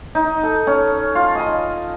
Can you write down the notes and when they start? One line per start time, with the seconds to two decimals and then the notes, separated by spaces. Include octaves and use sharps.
0.15 D#4
0.43 A4
0.67 C#4
1.15 F4
1.35 D#5 B5